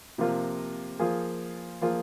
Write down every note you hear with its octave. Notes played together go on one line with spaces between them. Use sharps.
C3 F3 A#3 F4
F3 A#3 F4 G#4
F3 A#3 F4 G#4